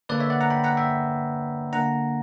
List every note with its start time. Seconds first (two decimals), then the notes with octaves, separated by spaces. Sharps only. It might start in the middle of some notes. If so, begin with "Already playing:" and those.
0.09 D3 A#3 D4 B4 D5
0.20 C#5 E5
0.30 D5 F#5
0.40 F#5 A#5
0.50 G5 B5
0.64 F#5 A#5
0.77 E5 G5
1.73 D3 A#3 D4 F#5 A#5